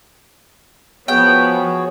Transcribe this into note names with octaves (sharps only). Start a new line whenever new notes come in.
F3 B3 F#4 G#4 C#5 G5